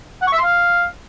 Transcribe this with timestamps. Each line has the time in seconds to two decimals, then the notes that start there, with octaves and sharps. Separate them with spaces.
0.22 F#5
0.27 C#6
0.33 E5
0.38 C6
0.44 F5